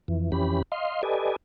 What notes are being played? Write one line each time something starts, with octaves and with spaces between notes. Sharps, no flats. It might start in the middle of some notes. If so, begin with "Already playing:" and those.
F2 E3
F2 E3 C#4 G4 B5
D#5 F5 C6
G4 A4 B4 D5 D#5 G#5